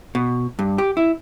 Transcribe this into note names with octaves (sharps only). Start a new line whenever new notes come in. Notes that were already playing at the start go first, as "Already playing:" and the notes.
B2
G2
G4
E4